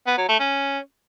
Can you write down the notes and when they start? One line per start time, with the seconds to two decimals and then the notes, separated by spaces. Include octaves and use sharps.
0.07 B3
0.18 F#3
0.29 A3
0.40 C#4